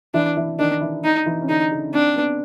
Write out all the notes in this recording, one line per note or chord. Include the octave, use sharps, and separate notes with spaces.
E3 D4 E4
E3 E4
D#3 D4 D#4
E3 E4
D#4
E3 E4
C#4
D3 D4 D#4
C#3 C#4
C4 D4
B3